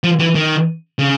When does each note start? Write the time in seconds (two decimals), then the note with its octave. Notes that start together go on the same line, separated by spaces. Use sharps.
0.04 F3
0.19 E3
0.35 D#3
0.99 C#3